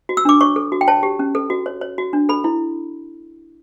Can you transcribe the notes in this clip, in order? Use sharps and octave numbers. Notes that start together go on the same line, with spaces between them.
F#4
E6
D4 D6
C#5 C#6
A4
F#4
G5
C#5 A5
G4
C#4
A4
F#4
C#5
C#5
F#4
D4
A4 B5
E4